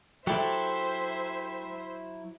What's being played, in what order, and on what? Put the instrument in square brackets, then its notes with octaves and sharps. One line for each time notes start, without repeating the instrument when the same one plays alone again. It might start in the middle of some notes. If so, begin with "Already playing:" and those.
[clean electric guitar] F#3 E4 [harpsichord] G4 A4 D5 [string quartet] C5 E5